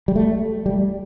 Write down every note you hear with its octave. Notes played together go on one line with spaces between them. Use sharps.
G3
A3
G3